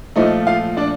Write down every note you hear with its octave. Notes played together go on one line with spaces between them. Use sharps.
A#2 F3 A3 D#4 D#5
F4 F5
D4 D5